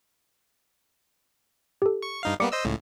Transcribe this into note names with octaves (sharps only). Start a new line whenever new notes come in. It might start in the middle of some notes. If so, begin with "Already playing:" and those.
G4 A4
C#6
G2 D#4 F5
G3 A#3 B3 D5 D6 C#7
C5 D#5 E6
C#2 A2